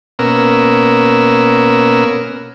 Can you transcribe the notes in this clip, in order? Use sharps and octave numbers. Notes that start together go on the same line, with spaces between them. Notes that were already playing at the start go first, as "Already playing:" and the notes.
B2 A#3 B3 C#4 A#4 E6